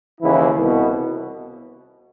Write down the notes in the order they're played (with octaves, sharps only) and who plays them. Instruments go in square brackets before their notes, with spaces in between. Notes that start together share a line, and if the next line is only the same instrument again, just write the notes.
[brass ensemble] D#2 C#3 E3 E4
C2 B2